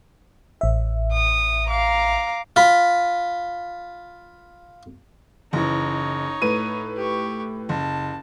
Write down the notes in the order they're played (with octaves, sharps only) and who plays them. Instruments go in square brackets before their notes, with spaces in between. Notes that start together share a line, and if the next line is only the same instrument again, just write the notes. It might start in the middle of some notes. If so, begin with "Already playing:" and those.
[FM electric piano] A1 E5
[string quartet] D#6
F5 A#5 D6
[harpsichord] F4 B5
[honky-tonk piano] F#1 E3 [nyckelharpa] D#4 C#5
[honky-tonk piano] A2 B4 D#7
[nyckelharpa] G4 C#6
[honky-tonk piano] F#1 [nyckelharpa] A5